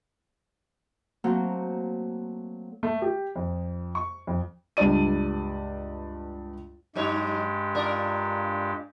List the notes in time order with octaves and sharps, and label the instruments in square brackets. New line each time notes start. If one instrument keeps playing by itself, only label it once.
[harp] F#3 A3 A#3 C4 F#4
[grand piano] A3
G4
F2
C#6
F2
[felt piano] C#2 G2 D4 D5 D#7
[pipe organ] G2 G#3 G4 [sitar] F#3 D#4 C#5
[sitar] D4 F4 A#4